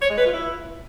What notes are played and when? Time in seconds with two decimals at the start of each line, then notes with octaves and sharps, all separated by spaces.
0.02 C#5
0.10 G#3
0.18 B4
0.26 F4
0.34 E4